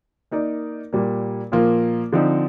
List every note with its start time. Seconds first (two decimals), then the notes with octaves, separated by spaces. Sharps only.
0.31 A#3 D#4 A#4 D5
0.93 A#2 G3 A#3
1.52 A#2 F3 A#3 F4
2.13 D3 F3 C4 D#4